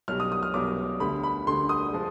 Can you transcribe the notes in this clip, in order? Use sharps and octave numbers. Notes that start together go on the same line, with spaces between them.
B1 B2 G3 F6
D#6
D#6
F6
B1 B2 G3 D6
D2 D3 G3 B5
B5
D2 D3 G3 C6
D#6
F3 G#3